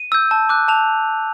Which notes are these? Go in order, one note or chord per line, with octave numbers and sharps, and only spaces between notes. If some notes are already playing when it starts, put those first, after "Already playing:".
Already playing: D#7
E6 G6
A5
D6 F#6
A5 F7